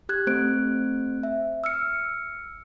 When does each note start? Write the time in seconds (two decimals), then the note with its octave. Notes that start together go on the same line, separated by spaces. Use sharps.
0.09 G4 F#6 G#6
0.27 A3 C4 C5 F#6 D7
1.23 E5
1.64 E6 F6 C#7